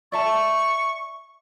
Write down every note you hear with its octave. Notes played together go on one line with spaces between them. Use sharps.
D5 E5 A5 C#6